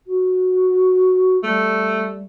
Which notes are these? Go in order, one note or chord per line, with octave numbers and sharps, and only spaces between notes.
F#4
G3 A3